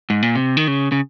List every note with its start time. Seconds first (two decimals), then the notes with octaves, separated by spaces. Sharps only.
0.10 G#2
0.22 A#2
0.35 C3
0.57 D#3
0.68 C#3
0.92 C#3